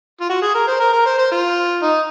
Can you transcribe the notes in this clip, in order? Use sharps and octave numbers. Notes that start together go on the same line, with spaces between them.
F4
F#4
G#4
A#4
C5
A#4
A#4
C5
C5
F4
D#4